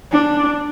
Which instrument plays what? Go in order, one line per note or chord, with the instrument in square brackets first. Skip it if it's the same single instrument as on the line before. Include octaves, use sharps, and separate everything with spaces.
[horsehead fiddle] D4